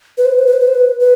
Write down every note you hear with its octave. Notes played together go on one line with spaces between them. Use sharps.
B4
C5
B4
C5
B4
C5
B4
C5
B4
B4